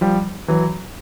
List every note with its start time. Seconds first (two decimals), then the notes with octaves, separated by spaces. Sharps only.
0.01 F3 G3
0.48 E3 F#3